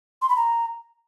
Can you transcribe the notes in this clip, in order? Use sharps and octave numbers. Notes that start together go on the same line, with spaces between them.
C6
B5
A#5